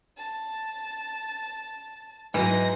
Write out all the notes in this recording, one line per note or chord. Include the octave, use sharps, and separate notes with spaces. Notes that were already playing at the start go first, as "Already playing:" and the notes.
A5
G#2 E3 F#3 D#5 A#6